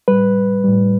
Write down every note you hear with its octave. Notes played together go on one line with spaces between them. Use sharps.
A2 G3 B4
A2 G3